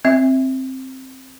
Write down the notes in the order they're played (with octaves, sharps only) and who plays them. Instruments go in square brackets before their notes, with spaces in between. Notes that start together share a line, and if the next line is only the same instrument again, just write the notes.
[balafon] C4 E5